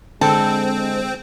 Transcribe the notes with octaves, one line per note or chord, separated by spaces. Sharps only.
D3 G#3 C4 A4 G5